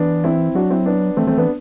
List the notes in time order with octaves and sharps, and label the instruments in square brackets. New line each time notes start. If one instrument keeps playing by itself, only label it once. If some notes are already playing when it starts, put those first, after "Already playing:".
Already playing: [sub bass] E3 [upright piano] B3 D4
[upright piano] C4 E4
[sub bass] F#3 [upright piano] D4 F#4
[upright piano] C4 E4
B3 D4
[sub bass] E3 [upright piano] A3 C4
[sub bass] E3 [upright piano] A3 C4
[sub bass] E3 [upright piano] B3 D4